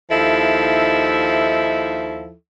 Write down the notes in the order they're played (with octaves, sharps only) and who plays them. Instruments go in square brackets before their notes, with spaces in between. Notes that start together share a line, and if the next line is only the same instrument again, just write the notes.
[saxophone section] D#2 F3 D#4 E4 A4 E5